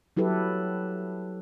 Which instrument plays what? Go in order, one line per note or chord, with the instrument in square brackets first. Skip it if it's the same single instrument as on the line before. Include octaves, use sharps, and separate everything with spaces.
[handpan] F#3 E4 G4 A4 B4